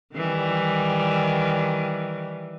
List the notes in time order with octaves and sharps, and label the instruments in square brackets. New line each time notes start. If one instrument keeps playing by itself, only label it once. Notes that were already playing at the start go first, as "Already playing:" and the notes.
[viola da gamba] D#3 E3 G3